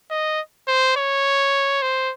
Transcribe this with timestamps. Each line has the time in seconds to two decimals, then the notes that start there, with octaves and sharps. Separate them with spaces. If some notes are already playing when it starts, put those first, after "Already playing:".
0.11 D#5
0.68 C5
0.96 C#5
1.82 C5